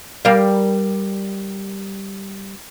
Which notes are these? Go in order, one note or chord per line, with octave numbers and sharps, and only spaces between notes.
G3 A#4 F5